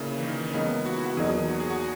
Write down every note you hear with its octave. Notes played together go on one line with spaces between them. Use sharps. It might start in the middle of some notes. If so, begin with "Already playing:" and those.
Already playing: A#2 C#3 A#3 E4
E3
D#3
C#4
C#2 C#3 E3 A#3 B3 D#4
F#4
E4
F#4
E2 B2 F#3 A#3 D#4 G#4
F#4
G#4
F#4